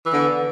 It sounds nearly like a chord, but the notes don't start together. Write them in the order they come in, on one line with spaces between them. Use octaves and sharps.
E3 B3 D3